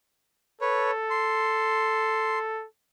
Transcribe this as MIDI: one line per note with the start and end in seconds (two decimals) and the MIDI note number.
0.61 2.66 69
0.61 0.91 71
0.61 0.91 73
1.10 2.38 84